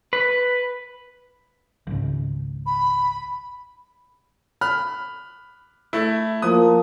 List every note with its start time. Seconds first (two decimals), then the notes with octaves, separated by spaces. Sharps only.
0.13 B4
1.87 G#1 C#2
2.66 B5
4.61 B5 F6
5.93 A3 E4
6.42 F3 A#3 D#6